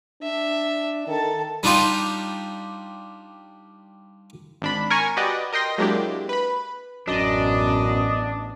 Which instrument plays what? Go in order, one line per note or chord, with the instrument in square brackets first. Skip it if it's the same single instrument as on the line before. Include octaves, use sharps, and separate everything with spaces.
[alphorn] D4 [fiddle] E5
[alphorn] D#3 [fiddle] A4 A5
[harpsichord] G3 D4 D#4 F4 G4
[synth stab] G#1 D4 B5
A#4 G#5 C#6
F#4 G4 B4 D5 D#5
A#4 D#5 G5 C6 A#6
F#3 G#3 A#3 D4 E4 G4
B4 B5
[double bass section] A1 B3 [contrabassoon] F#2 [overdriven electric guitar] D4 [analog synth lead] D#5